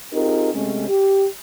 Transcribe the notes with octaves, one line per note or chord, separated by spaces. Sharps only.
C4 D#4 F4 G4 G#4 A#4
C3 G#3 A3 C4 C#4
G4